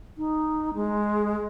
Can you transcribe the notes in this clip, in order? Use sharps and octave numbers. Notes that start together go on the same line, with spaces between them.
D#4
G#3